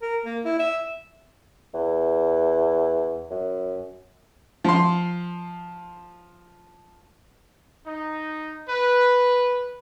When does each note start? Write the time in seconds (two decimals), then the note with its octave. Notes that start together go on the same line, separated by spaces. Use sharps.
0.02 A#4
0.26 A#3
0.45 E4
0.60 E5
1.74 E2
3.31 F#2
4.64 F3 C6
7.86 D#4
8.69 B4